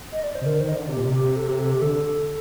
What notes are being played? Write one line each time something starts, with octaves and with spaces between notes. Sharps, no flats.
D#5
D5
C5
C3
D3 A#4
D#3 C5
D#5
D3 D5
C3
G4
A#2
C3
G4
A4
G4
A4
G4
D3 A4